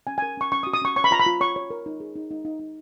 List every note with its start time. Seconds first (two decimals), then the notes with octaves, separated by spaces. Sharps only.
0.07 C#4 G#5
0.18 A#4 G#5
0.37 C#4 C#6
0.52 C#4 C#6
0.63 D#6
0.67 F#4
0.74 D#6
0.82 C#4 C#6
0.96 C#5 C#6
1.04 B5
1.11 F4 A#5
1.20 B5
1.26 F4
1.41 C#5 C#6
1.56 C#5
1.70 A#4
1.86 D#4
2.00 G#4
2.15 D#4
2.31 D#4
2.45 D#4
2.59 D#4